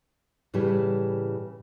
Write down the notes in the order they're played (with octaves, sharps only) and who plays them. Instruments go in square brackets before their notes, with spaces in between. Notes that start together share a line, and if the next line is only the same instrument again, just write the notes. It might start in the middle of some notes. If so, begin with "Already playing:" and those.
[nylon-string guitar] A2 C#3 E3 G3